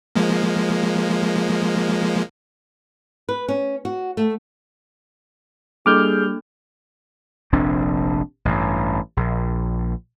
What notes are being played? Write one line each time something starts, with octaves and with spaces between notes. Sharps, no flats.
F3 G#3 A#3
B4
C#4
F#4
A3
G3 A#3 D4 G#4 A4 D6 F6 G6
F1 A#1 C4 D4
A1 G2
A#1